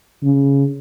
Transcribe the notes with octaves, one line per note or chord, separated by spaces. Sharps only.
C#3